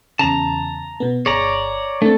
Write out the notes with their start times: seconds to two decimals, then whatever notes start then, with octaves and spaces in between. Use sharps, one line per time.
0.19 E2 C#3 A5 A#5
1.00 B2 B3
1.26 G1 G#4 C#5 D5 A#5
2.02 A3 C4 D4 A4